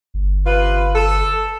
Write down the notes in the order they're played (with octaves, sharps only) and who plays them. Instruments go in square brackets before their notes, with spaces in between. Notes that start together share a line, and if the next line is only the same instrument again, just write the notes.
[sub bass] G1
[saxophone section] C3 F4 B4
A4